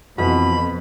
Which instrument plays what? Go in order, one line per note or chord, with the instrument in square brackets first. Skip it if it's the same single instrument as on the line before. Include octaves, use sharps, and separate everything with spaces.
[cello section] F2 [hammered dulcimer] B2 [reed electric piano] E3 F#4 [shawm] B5